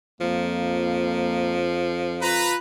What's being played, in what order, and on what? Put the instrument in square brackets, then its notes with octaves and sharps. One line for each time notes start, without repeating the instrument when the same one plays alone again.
[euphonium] F2 [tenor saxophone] F3 [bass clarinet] A#3
[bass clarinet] F4 [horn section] B4 A#5